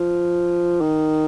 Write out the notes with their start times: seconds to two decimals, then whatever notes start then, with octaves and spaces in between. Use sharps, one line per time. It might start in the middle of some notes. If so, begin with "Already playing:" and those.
Already playing: F3
0.81 D#3